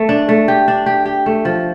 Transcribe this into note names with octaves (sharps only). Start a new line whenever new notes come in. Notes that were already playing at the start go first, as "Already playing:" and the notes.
Already playing: A3
D4
A3
G4
D4
G4
G4
A3
F3